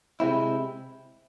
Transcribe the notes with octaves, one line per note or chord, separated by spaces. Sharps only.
C3 G#3 C4 E4